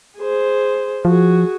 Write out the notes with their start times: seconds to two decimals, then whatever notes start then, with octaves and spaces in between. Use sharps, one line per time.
0.18 G#4 C5
1.05 F3 F#4 G#4